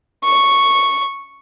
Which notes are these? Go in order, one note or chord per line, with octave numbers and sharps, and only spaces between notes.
C#6